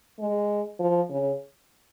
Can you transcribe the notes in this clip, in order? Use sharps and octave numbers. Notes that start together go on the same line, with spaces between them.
G#3
F3
C#3